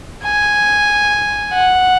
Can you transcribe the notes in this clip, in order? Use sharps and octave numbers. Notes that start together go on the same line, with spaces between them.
G#5
F#5